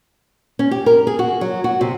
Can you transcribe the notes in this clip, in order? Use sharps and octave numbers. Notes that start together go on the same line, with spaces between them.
C#4
G4
A#4
G#4
F#4
F#3
F#4
C3